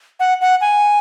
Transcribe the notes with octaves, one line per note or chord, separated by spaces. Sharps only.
F#5
F#5
G#5